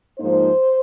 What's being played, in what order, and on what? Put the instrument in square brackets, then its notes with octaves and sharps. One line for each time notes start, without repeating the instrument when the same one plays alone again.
[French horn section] G#2 F3 A#3 D#4 C5